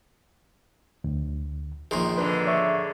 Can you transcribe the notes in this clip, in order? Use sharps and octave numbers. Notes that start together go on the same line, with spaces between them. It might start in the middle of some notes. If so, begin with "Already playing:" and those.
D2
A#1 D#3 G#4 C6
G#2 D3 G#3 B4
C#5 E5 C#6